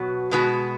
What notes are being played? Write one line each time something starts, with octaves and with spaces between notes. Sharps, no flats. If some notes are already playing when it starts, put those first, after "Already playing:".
Already playing: B2 F#3 B3 F#4
B2 G#3 B3 F#4